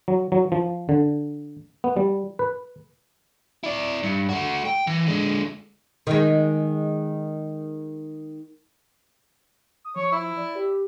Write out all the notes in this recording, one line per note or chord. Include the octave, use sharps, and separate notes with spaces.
F#3
F#3
F3
D3
B3
G3
B4
E4 D5
G2
A3 F#4
G5
E3
D3 G#3
D#3 G#3
D#6
F3 C#5
E4
D5
G4